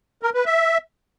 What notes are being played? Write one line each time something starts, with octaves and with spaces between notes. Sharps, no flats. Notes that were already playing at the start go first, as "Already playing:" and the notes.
A#4
B4
E5